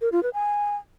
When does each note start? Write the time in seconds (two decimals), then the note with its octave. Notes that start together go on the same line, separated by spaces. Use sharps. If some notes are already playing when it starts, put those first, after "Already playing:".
0.01 A#4
0.12 F4
0.23 B4
0.34 G#5